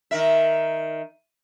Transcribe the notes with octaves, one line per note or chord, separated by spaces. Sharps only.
D#3 A#4 E5